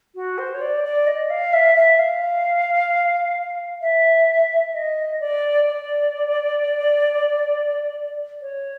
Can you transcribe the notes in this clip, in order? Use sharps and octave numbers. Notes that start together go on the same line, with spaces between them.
F#4
C5
C#5
D5
D5
D#5
F5
E5
E5
F5
E5
D#5
D5
D5
C#5